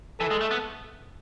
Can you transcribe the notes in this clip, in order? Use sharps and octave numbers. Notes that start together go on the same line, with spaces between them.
E3 A4
G#3
A3
B3